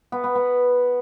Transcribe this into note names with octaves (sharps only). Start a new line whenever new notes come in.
B3
B3
B3